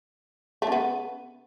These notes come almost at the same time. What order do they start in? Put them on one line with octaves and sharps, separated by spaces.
A3 C#3 B3